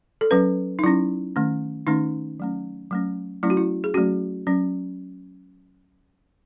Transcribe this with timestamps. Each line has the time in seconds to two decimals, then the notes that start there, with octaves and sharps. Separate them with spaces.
0.21 A4
0.31 F#3 C#4 B4
0.79 D#4
0.83 F#3 C#4 E4
1.36 D#3 A3 C#4
1.87 D#3 A3 C#4 D#4
2.40 F#3 A3 C#4
2.91 F#3 A3 C#4
3.43 F#3 A3 C#4 E4
3.50 F#4
3.57 E4
3.84 G#4
3.94 F#3 A3 C#4 F#4
4.47 F#3 C#4